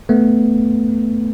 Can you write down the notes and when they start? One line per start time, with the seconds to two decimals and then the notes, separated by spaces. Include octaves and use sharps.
0.09 A3 B3